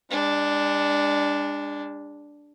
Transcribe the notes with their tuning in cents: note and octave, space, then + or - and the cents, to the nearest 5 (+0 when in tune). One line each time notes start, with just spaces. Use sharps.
G#3 -40 D4 +0